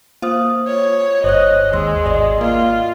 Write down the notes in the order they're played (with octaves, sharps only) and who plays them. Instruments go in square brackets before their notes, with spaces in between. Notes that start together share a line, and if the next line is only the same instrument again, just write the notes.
[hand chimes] A#3 C5 D#6 [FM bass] F4
[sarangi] C#5
[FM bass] G1 [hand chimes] C5 C#5 F#6 [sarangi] D#5
[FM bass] D#2 [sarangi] G#3 [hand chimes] C6 E6
[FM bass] G#1 [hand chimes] D5 D#5 C6
[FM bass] A#3 [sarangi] F4